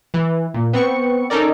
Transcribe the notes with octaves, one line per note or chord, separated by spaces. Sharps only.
E3
A#2
B3 C4 C#6 C#7
C#4 D#4 A4 A#4 D5